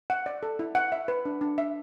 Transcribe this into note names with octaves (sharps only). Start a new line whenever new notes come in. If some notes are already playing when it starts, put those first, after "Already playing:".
F#5
D5
A4
E4
F#5
E5
B4
D4
D4
E5